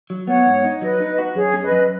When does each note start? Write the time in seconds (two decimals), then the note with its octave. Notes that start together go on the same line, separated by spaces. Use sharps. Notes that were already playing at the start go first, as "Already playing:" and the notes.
0.10 F#3
0.27 B3 C#5 F#5
0.46 G#2
0.64 D#4
0.81 F#3 B4 D#5
1.00 D#4
1.18 F#4
1.35 F#2 G#4 C#5
1.54 C#4
1.63 B4 D#5
1.72 F#2